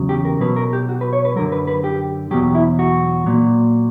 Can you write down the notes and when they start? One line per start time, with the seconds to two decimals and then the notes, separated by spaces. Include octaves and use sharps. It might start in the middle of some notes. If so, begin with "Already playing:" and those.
Already playing: E2 C#3 F#3
0.09 G4
0.25 A#4
0.40 B2 F#3 B4
0.56 A#4
0.73 G4
0.89 F#4
1.01 B4
1.13 C#5
1.25 B4
1.36 F#2 D3 F#3 A#4
1.52 B4
1.67 B4
1.84 G4
2.31 E2 B2 F#3 G4
2.55 E4
2.79 F#4
3.26 A#2 F#3